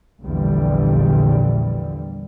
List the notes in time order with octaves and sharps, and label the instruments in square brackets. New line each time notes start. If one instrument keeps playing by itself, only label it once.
[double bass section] A#1 E2 A#2 D3 G3